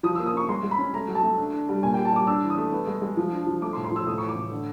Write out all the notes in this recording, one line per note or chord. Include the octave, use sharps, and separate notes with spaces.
F3 D#6
E6
A#3
D#6
C#4 C#6
G#3 C6
G#3
B5
C#4
A3 A#5
F#3
A5
A3
D4
D4
G3
A#2 G#5
G5
G3
A5
G3 D6
D4 E6
E3
D#6
A3
B3
G#3
G#3
F3
D4
F3
A3 D6
C6
A2
C6
F3 E6
A2 D#6
E3 C#6
D6
A2
D3